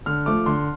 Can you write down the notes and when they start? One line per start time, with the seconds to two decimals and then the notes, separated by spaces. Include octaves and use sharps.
0.06 D3 F6
0.26 F3 A3 D6
0.46 D3 C6